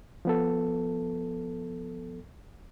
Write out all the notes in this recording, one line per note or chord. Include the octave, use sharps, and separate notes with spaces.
F3 B3 A4